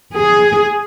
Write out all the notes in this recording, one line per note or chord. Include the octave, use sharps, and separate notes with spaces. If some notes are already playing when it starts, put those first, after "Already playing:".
G#4